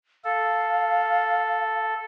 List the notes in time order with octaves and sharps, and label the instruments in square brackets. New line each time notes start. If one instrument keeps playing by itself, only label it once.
[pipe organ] A4 [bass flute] F5